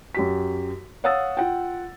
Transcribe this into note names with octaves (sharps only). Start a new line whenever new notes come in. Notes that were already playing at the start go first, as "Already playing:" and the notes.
F#2 G4 B6
C#5 F5 F#5 D#6 E6 A6
F4 F#5 G5